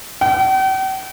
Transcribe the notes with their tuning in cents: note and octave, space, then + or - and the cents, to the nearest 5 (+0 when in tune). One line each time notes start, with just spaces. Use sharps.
G5 -45